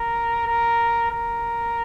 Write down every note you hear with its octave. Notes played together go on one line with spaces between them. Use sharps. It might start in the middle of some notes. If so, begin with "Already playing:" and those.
Already playing: A#4
A#4
A#4